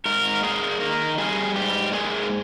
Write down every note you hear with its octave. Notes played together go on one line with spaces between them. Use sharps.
G#2 A#4
A#3 G#4
D#3 A#4
G3 G#4
G#2 G4
A#3 G#4